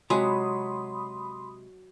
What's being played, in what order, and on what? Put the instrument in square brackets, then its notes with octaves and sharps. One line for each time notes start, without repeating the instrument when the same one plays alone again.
[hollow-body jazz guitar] C3 G#3 G#5 [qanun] F#3 [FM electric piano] B5 C6 D#6